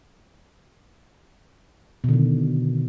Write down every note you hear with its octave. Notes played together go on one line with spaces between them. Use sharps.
B2 D3 D#3